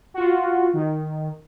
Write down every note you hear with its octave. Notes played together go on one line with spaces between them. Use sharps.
F4 F#4
D#3